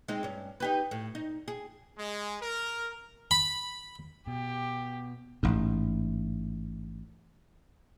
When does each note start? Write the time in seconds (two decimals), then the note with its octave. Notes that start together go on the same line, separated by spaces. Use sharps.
0.08 G#3 C4 D#4
0.23 G2 C#4
0.60 D#4 G4 B4
0.91 A2
1.15 D#4
1.48 G#4
1.98 G#3
2.41 A#4
3.31 B5
4.27 B2 G4
5.43 A1 G#2